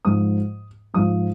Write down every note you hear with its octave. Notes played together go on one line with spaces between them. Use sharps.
G#2 F3 D#6
G#2 F3 D#6